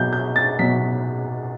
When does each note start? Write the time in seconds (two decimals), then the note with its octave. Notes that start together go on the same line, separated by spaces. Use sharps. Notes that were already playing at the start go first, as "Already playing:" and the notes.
Already playing: B2 F#3 G6
0.13 G6
0.36 A6
0.59 B2 F#3 B6